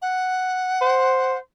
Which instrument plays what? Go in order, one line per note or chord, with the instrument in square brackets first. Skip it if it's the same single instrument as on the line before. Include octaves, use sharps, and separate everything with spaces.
[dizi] F#5
[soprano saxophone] C5